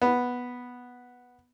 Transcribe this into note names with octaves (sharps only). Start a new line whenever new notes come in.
B3